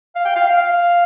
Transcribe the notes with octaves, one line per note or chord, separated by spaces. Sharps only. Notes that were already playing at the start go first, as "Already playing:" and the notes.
F5
G5
F5
F5
F5